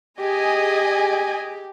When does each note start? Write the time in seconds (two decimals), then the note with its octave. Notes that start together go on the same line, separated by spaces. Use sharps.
0.20 G4 G#4 D#5 G#5